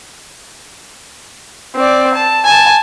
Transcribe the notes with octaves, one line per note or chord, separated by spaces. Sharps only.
C4 D5
A5
G#5 A5